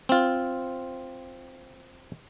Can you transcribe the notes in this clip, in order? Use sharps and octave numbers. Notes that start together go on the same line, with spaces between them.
C4 F4